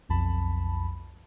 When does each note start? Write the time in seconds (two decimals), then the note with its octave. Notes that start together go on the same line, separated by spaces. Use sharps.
0.09 B1 F2 A5 B5